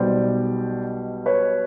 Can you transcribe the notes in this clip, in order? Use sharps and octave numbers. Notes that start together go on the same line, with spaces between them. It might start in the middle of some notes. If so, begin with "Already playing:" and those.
Already playing: B1 B2 G3 C5 D5
B4 C#5